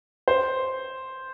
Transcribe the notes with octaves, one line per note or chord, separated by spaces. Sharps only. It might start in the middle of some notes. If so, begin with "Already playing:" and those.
C5